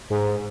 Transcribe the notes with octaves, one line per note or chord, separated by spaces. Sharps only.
G#2